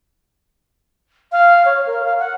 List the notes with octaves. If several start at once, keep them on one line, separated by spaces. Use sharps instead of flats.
F5
C#5
A#4
F5
F#5